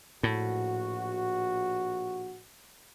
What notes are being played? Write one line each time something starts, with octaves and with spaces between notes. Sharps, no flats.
A#1 A2 F#4